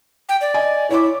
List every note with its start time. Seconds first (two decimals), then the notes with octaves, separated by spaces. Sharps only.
0.29 G5
0.41 D5
0.54 D#5 G#5
0.91 E4 C#5 D6